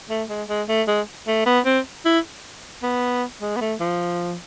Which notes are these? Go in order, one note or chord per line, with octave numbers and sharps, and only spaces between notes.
A3
G#3
G#3
A3
G#3
A3
B3
C4
E4
B3
G#3
B3
A3
F3